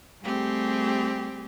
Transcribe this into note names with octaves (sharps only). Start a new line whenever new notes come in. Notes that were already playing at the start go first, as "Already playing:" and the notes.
G3 A3 C4 G4 G#4